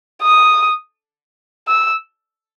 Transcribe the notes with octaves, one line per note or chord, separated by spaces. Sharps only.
D#6
E6